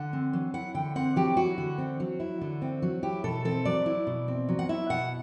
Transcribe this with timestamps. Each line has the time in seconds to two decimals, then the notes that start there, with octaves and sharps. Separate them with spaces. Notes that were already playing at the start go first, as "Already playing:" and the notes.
Already playing: D3 F#5
0.13 C4
0.33 F#3
0.54 E4 F#5
0.75 D3 G5
0.96 C4 F#5
1.16 F#3 G4
1.37 E4 F#4
1.58 D3
1.78 C4
2.00 F#3
2.20 E4
2.41 D3
2.62 C4
2.82 F#3
3.03 E4 G4
3.24 B2 A4
3.45 C4 A4
3.65 F#3 D5
3.86 E4
4.07 B2
4.28 C4
4.49 F#3
4.59 F#5
4.69 E4 E5
4.90 B2 F#5